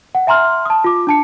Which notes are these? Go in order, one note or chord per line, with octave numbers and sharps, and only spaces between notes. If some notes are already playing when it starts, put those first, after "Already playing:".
F#5
E5 G#5 A#5 C6 F6
A5 D#6
F4 D6
D4 A5 C#7